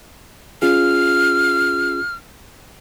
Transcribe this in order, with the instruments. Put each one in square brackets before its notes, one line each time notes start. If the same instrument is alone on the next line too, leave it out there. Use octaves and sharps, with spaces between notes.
[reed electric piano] C#4 F4 G#4 [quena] F6